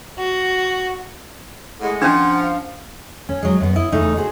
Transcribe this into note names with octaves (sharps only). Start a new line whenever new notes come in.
F#4
A2 G#3 F#5
F3 C#4 D4
F5
C#4
F#3 G#3
F#2 B3
E4 D#5
E2 C#3 A3 D#4
F#4 G#4 C5